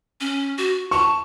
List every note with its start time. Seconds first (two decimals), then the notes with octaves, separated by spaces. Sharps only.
0.21 C#4
0.58 F#4
0.91 A5 C#6